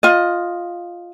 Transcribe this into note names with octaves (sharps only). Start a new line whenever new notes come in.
F4 D#5